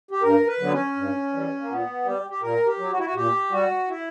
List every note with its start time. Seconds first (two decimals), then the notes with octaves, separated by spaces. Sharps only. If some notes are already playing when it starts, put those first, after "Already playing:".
0.11 G4
0.22 G2 A#4
0.47 B4
0.59 D3 F#3 B3
0.71 C#4
0.96 G2
1.32 E3 G3
1.60 A#3
1.69 A#2 B3
2.05 G3 G4
2.30 G4
2.42 A#2 A#4
2.66 G4
2.78 F#3
2.91 F#4
2.98 E4
3.05 F#4
3.14 A#2 G4
3.51 G3 F#4
3.88 E4